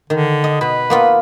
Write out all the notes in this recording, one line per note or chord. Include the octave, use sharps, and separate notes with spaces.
D3 D#3
D#5
B2 B4
A#3 B3 F4